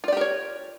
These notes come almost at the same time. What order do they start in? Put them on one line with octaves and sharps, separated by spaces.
F4 D5 G4 A#4 C#5